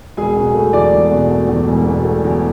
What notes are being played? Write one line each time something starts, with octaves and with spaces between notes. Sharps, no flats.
E1 G#4 G#5
B2
A3
E2 D5 D6
E1
B2
A3
E2
E1
B2
A3
E2